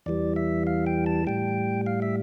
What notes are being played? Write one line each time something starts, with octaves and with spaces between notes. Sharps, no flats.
E2 E3 G3 D5
E5
F5
G5
A5
A2 G3 G5
F5
E5